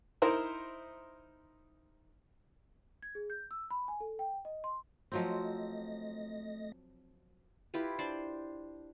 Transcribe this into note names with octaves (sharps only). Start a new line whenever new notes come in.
D#4 E4 A#4 C5 E5
G#6
G#4
G6
E6
B5
G#5
A4
G5
D#5
C6
F3 F#3 A3 C4 D#5 A#6
E4 F4 G4 B4
D4 C5 D5